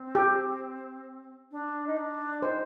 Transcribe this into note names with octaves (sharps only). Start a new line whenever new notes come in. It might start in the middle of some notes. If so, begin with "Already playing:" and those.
Already playing: C4
G4
D4
D#4
D4
D#4 C5